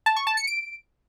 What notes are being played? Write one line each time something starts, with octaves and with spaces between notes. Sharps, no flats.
A5
C#6
A5
C#7
D7